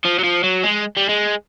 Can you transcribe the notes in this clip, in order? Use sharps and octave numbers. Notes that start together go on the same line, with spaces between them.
F3
F#3
F3
F#3
G#3
G3
G#3